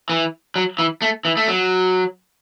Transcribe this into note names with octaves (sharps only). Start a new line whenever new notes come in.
E3
F#3
E3
A3
E3
A3
F#3